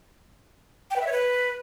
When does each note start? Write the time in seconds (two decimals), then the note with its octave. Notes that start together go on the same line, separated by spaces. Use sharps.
0.90 G5
0.96 B4
1.01 E5
1.07 C#5
1.12 B4